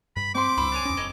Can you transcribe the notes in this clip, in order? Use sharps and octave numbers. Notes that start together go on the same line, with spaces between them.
G2 B5
C4 C6 D6
C#2 G2 E4 B5 E6
D4 C#5 G#5
E2 C#4 D#4
F#1 A4 C#5 D#5